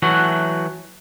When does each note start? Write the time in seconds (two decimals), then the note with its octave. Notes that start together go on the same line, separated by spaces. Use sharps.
0.02 E3 F#3 A3 F#4 F#5